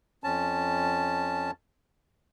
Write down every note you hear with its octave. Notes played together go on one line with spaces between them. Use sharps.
F2 C#4 A5